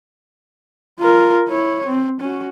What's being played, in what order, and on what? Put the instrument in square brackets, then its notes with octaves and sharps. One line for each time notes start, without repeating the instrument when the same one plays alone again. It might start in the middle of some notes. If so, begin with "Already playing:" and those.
[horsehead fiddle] F4 A#4
E4 C#5
C4
C#4 F#4